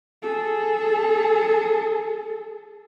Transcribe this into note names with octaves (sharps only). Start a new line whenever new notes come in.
G#4 A4